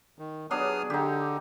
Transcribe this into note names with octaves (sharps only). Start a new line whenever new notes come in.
D#3
F#3 B3 D4 G#4 D#6 F6
D3 D#4 G4